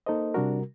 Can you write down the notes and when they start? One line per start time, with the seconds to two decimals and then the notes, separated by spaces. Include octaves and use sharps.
0.06 A#3 D#4 A4 C5 D#5
0.34 C3 G3 D4 F#4 A#4